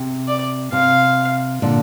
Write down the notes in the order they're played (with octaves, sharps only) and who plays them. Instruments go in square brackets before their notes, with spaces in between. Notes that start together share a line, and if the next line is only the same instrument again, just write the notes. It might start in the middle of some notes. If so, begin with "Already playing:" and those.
Already playing: [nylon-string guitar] C3
[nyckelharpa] D5
[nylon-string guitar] C3 [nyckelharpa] F5
[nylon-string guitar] A#2 D3